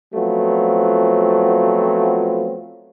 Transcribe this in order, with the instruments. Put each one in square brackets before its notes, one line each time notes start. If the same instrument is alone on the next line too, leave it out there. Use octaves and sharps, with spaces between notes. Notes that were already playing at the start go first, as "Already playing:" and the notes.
[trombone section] F3 F#3 A3 B3 C4 F4